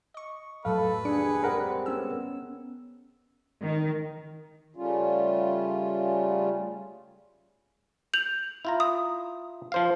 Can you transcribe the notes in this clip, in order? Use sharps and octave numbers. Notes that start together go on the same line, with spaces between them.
D#5 C#6
F2 A2 F#3 A4 B4 F5
D#2 D4 G#4 C#7
G3 G#3 C4 G#4 A#4 F#5
B3 C#4 E6
D#3
C#3 G3 A3 C#4 F4
G6 F7 F#7
E4 F4 A#5
D#6
F3 C5 F5